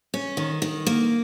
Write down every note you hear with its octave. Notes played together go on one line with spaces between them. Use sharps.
C#4
D#3
D#3
A#3